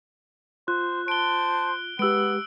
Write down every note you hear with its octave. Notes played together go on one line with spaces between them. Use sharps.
F4 C5 F#6
C5 A5 D7 G7
G#3 B3 G4 B4 E6 D7